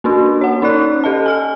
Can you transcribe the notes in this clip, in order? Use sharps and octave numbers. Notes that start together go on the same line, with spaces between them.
A#3 C#4 D4 F#4
C#5 F#5
C#4 D#4 D5 F#6
G4 A4 D#5 A5
G#5 F6